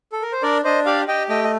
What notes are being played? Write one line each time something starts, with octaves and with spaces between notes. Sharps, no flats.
A4
A#4
C5
D4 A#4 D5
D4 C5 D#5
G4 D5 F5
G4 D#5 G5
A3 D#5 G5
D#5